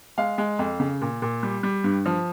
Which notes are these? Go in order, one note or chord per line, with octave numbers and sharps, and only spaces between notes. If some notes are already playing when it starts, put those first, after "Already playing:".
G#3 F5
G#3
F2
C#3
A#2
A#2
G3
G3
G2
F3